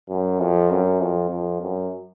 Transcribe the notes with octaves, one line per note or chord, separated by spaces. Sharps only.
F#2
F2
F#2
F2
F2
F#2